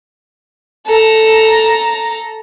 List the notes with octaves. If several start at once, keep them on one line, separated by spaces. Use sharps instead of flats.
A4 A#5